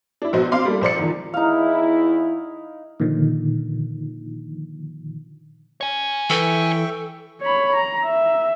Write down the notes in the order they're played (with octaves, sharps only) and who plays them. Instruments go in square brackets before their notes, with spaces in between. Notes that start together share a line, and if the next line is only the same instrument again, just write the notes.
[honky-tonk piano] D4 E4
A#1 B3 F#4 C5 D#5
F#3 C4 F5 C6 D6
G3 A#3 D4 A4
A#1 C5 D5 C#7
E2 D#3 F3
[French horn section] E2 E4 [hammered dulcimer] D#4 F5
[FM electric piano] A#2 D3 D#3 F3
[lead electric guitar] C#5 G#5
[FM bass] E3 [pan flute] A4 [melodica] E5 G5 C#6
[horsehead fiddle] C#5 B5
A#5
E5